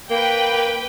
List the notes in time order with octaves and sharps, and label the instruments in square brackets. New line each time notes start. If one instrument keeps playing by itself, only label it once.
[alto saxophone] A#3 [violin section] B4 G5